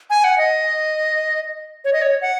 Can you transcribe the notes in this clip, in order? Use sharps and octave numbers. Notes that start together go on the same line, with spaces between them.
G#5
F#5
D#5
C#5
D#5
C#5
F#5